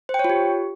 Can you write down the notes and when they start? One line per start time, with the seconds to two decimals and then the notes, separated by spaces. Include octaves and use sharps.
0.09 C5
0.14 G5
0.19 C#5
0.24 F4
0.30 G4